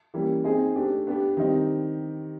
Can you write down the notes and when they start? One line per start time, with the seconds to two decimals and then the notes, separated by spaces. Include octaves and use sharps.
0.14 E3 G3 A#3 C#4
0.44 C4 D#4 G#4
0.75 A3 D4 G4
1.07 B3 D4 G4
1.37 D#3 G3 C4 D#4